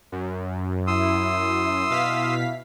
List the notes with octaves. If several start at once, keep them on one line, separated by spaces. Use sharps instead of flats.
F#2
E4 C6 D#6 E6
B2 F5 B6